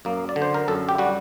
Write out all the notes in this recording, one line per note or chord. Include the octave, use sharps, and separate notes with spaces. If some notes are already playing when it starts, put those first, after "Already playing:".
F#2 A#3
D5
D3
C5
A#4
F#2 A4
G4
G3 F#4